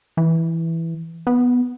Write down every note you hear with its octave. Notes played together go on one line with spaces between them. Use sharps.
E3
B3